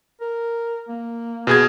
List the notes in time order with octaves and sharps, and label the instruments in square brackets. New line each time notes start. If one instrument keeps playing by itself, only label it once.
[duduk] A#4
A#3
[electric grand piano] B2 G#4 G#6